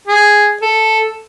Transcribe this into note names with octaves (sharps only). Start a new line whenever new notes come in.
G#4
A4